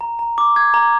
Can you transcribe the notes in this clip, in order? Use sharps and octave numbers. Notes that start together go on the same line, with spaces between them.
A#5
A#5
D6
G#6
A#5